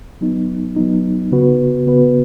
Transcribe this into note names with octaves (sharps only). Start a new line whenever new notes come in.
F#3 B3 D#4
F#3 B3 D#4
C#3 B3 F#4 B4
C#3 B3 F#4 B4